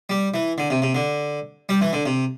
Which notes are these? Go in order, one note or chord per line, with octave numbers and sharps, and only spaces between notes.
G3
E3
D3
C3
C3
D3
G3
E3
D3
C3